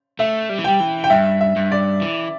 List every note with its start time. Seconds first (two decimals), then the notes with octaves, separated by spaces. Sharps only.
0.19 A3 E5
0.49 G3
0.58 E3
0.64 G3 G5
0.80 E3
1.04 G5
1.10 G2 E5
1.41 E5
1.56 G2
1.72 D5
2.02 E3